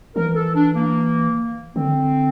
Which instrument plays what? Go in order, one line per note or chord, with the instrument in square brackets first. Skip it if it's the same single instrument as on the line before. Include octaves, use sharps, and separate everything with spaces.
[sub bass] E3 [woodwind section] A#4
[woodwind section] A4
D4
A#3
[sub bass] D3 [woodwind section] C4